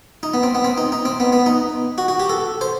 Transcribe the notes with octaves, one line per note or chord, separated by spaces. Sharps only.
D#4
B3
C4
B3
C4
D#4
D#4
C4
B3
B3
D#4
F#4
F#4
G4
A4
C5